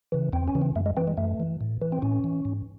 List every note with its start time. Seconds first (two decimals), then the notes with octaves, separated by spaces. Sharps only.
0.12 C#3 E3
0.33 E2 C4
0.48 C#4
0.55 C#3 E3
0.62 C4
0.76 F#2 A3
0.86 G#3
0.97 E3 C4
1.08 G#3
1.17 F#2 A3
1.40 E3
1.61 A2
1.82 E3
1.92 C4
2.02 A2 C#4
2.24 E3
2.45 G#2